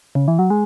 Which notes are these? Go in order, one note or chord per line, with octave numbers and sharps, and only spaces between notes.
C#3
E3
F#3
G#3